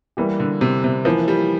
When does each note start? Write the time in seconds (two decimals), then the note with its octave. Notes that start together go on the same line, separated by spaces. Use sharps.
0.17 E3 G3 A#3 E4 G4
0.40 D3
0.61 C3
0.84 C3
1.05 E3 F3 A#3 E4
1.28 G3